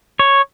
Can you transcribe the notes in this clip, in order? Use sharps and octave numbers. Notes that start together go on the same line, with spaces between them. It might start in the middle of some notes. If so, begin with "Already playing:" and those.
C#5